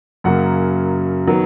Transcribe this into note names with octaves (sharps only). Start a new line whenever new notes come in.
F#2 C#3 F#3 A#3 F#5
D#3 F#3 B3